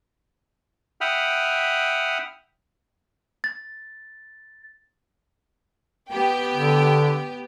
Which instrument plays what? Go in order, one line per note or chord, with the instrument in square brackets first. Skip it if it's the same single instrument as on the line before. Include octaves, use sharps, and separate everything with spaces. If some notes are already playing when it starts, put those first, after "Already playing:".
[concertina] E5 F#5 G5 B5 D#6 F6
[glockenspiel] A6
[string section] B3 G4 G5
[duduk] D3